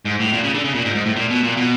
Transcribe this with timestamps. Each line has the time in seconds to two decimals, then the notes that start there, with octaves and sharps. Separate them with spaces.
0.05 G#2
0.20 A2
0.33 A#2
0.43 C#3
0.54 D3
0.64 C#3
0.75 A#2
0.85 G#2
0.95 G#2
1.06 A2
1.16 A#2
1.30 B2
1.44 A#2
1.57 B2